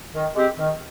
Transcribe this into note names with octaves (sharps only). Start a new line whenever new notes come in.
D#3
G#3 C4 G4
D#3